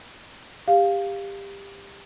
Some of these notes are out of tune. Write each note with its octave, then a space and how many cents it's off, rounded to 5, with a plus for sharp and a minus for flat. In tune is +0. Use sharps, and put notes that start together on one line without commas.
G4 +20 F5 +0